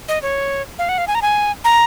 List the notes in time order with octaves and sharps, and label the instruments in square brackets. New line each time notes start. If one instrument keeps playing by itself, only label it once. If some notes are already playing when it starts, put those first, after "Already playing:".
[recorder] D#5
C#5
F5
F#5
F5
G#5
A#5
G#5
A#5